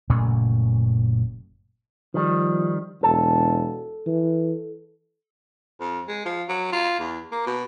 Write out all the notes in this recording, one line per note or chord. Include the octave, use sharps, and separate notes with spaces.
F#1 A#2 A3 C#4
D#3 F3 G3
E1 A4
E3
F2
G#3
F3
F#3
F4
E2
A#3
B2